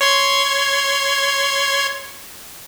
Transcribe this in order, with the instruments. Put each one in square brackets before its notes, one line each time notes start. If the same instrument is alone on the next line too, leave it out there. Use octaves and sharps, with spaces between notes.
[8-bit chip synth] C#5 C6 G#6